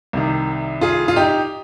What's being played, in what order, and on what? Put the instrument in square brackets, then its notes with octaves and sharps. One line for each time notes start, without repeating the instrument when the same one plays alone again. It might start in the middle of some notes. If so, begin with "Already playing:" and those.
[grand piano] C2 C3 D#3
F4 G#4
F4
D#4 G4